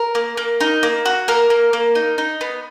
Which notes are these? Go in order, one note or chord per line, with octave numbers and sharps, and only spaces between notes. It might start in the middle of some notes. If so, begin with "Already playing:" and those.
Already playing: A#4
A#3
A#3
D#4
A#3
F#4
A#3 A#4
A#3
A#3
D#4
D#4
B3